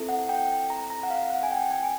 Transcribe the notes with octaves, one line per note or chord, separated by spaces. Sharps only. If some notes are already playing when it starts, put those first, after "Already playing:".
Already playing: C4 E4 A4
F#5
G5
A#5
A#5
F#5
F5
F#5
G#5
G5
G#5
G#5